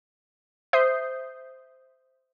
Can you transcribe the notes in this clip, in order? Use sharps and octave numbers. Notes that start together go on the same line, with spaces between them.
C5 E5 D#6 G6 C7